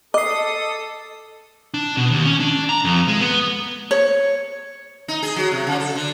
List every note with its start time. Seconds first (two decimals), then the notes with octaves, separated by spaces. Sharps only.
0.14 A4 D#5 D6 D#6 C7
1.74 D4
1.97 B2
2.10 D#2
2.25 C#4
2.40 D4
2.69 A#5
2.85 F2
3.08 G#3
3.21 B3
3.91 C#5
5.08 D#4
5.23 G#4
5.36 F#3
5.52 C3
5.67 C#3
5.80 A4
5.95 D3